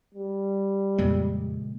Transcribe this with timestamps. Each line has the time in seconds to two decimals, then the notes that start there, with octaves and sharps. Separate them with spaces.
0.14 G3
0.98 F2 A#2 C#3 G#3